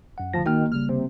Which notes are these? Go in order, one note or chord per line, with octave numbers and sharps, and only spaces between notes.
F#2 F#5
D1 D3 F3 A5 A#6
D#3 A#3 F#4 G5 F6
A1 C#3 G3 F6
C3